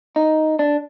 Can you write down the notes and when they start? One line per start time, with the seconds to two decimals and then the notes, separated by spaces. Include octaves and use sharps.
0.16 D#4
0.59 D4